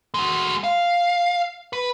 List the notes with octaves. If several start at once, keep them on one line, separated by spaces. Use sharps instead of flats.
G#3 F#4
F5
B4